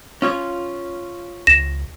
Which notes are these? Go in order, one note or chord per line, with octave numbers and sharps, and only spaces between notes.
C#4 F4 C#5
C#2 A#6 E7